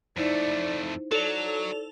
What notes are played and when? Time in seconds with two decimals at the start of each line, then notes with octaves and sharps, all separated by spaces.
0.17 F2 A3 D#4 E4 C5 D5
1.11 F#3 A4 D5 F7